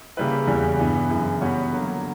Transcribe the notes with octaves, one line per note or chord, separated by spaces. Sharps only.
C#3 G3 A#3 E4 B4
E2 C#3 E3 G3
G2 E3 B3
F#2 C#3 E3
E3 G3 B3 F#4 C#5
D3 F#3 A#3